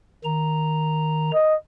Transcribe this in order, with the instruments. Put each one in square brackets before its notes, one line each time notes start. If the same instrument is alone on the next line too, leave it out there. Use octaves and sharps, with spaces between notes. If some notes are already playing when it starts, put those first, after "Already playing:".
[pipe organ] D#3 A#5
[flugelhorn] D#5